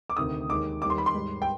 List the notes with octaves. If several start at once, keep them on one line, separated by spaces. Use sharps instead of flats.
D6
D2 C3 D#3 D#6
D#2 D#3 G#3 D6
D#2 D#3 G3 D6
C6
B5
C6
G#2 G3
G5